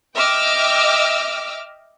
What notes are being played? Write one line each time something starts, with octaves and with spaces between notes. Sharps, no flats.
D#5 E5 G5 D6 E6 F6